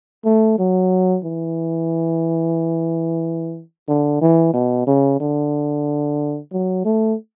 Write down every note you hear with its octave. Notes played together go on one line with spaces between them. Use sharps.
A3
F#3
E3
D3
E3
B2
C#3
D3
F#3
A3